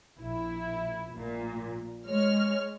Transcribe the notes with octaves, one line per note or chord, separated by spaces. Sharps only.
A#1 E4
A#1 A#2
G#3 C#5 F6